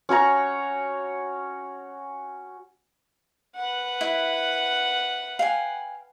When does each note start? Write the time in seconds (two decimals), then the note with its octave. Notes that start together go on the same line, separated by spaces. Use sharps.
0.09 C#4 F#4 C#5 A#5
3.55 B4 F#5
4.01 E4
5.39 F5 G5 G#5